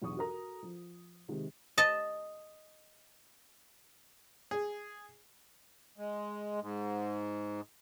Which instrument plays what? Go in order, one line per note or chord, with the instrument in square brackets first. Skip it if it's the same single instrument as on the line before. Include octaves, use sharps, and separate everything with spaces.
[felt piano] B1 E2 D4 C#6 D#6
F#4 A4 A#4 A#5
F3
C3 D#3 G#3
[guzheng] D#5 A5
[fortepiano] G#4
[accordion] G#3
G#2